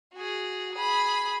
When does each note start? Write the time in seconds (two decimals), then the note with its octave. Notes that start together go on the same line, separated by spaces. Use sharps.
0.14 F#4 G#4
0.74 G#4 B5